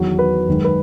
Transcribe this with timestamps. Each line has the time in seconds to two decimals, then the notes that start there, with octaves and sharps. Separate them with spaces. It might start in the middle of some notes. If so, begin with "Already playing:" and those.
Already playing: E2 D#3 F#3
0.19 B4
0.48 F#2 D#3 G#3
0.65 B4